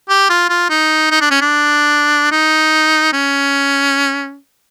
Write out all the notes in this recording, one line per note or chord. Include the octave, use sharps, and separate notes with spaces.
G4
F4
F4
D#4
D#4
D4
C#4
D4
D#4
C#4